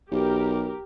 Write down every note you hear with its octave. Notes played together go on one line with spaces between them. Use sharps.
B1 G4 A#4